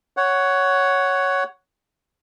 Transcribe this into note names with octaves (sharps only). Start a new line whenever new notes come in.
C#5 F#5